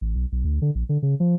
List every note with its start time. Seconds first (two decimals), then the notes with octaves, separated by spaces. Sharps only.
0.01 A1
0.16 B1
0.32 B1
0.44 D2
0.62 D3
0.75 A#1
0.89 D3
1.03 C#3
1.20 F3